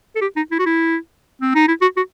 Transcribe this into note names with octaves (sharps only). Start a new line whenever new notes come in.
A4
G4
D#4
E4
F#4
E4
C4
D#4
E4
F#4
F#4